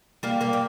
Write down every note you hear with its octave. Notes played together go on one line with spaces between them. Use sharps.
G3 A#3
G3 A#3
G3